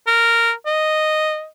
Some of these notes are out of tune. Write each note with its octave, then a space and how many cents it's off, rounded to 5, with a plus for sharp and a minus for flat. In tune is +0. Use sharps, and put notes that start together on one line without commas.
A#4 -10
D#5 -5